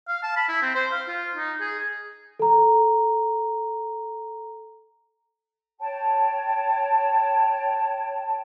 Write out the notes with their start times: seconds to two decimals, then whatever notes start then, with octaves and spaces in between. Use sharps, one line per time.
0.08 F5
0.23 A5
0.37 B5
0.49 E4
0.62 C4
0.75 C5
0.92 F5
1.09 F4
1.35 D#4
1.61 G#4
2.40 A4 A#5
5.80 C#5 G5 A5